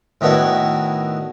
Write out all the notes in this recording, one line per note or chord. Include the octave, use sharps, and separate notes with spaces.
A2 D#3 B3 D4 E4 F#4